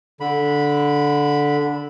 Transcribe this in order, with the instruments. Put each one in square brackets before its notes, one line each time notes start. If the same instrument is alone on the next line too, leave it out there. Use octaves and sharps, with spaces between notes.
[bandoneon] D3 B5